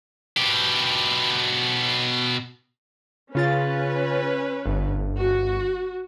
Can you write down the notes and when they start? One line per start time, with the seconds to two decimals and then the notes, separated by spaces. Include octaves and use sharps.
0.37 B2 G4
3.35 C#3 C#4 F4 B4 A6
4.66 G1
5.19 F#4